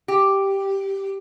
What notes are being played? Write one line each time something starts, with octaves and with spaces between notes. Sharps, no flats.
G4